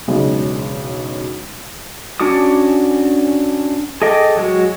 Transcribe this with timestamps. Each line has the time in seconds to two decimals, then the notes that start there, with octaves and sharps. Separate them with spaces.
0.08 E1 B1 C#3 G#3
2.20 C#4 D4 F#4 D6 D#6
4.02 G#4 A4 D#5 G5 D6
4.37 F#3 G#3 F#4